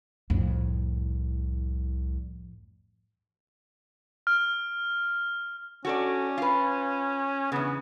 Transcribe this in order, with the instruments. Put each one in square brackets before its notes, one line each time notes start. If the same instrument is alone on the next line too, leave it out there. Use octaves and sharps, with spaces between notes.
[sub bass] C2 [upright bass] F2 A2
[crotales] F6
[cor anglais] C#4 [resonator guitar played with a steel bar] F#4 A4 D5
[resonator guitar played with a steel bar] F4 B4
[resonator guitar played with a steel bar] E2 C#3 [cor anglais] B3